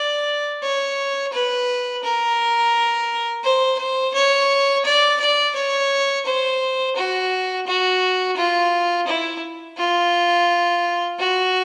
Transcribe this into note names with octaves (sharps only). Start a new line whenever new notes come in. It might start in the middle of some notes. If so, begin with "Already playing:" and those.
Already playing: D5
C#5
B4
A#4
C5
C5
C#5
D5
D5
C#5
C5
F#4
F#4
F4
E4
F4
F#4